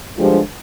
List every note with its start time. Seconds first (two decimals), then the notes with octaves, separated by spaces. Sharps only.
0.17 G2 D3 F3 G#3 F4 G4